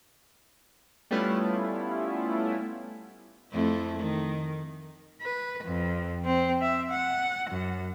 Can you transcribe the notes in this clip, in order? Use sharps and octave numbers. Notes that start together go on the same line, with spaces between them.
G3 A3 B3 C#4 E4 F4
F2 A3 E4
D#3
B4
F2
C4
E5
F#5
F#2